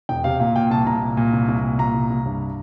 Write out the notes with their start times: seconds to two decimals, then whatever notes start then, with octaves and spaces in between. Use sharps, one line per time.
0.09 E1 G5
0.24 C3 F5
0.40 A#2 F5
0.56 A#2 G5
0.71 C2 A5
0.86 C2 A#5
1.02 A#2
1.17 A#2
1.33 C2
1.48 C2
1.64 A#2
1.79 A#2 A#5
1.95 C2
2.10 C2
2.26 G2